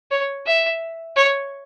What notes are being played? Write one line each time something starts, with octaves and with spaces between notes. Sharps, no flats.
C#5
E5
C#5